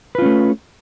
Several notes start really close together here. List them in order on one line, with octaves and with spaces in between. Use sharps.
B4 F4 C#4 A3